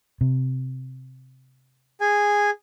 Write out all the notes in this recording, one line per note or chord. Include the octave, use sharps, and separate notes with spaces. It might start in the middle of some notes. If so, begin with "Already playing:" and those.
C3
G#4 G#5